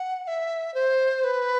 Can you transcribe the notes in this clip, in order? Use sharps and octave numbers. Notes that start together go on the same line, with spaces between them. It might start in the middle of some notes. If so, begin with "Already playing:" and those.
Already playing: F#5
F#5
E5
C5
B4